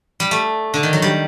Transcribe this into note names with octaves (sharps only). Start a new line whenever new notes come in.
G3
A3
D3
D#3
F#3
G3